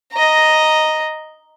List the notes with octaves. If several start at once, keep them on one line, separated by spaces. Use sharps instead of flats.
D#5 A#5